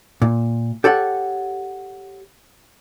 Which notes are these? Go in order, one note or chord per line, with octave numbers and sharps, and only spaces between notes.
A#2
G4 A4 C#5 F#5